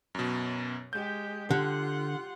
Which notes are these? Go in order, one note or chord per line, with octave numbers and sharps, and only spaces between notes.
F#2 B2
G#3 G4 G6
D3 F4 G4 F#5 C6